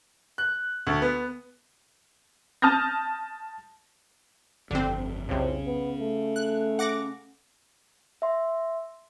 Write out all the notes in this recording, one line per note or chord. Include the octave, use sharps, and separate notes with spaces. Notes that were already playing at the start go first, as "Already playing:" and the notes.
F#6
D2
B3
A5 D#6 F6 G6 A#6
G1 F2 D3 C4
C2 F2 C#3 C#4
B3
A3
F#6
F#5 D6 A#6
E5 C6